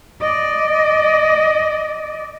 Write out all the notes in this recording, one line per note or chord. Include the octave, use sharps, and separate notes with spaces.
D5 D#5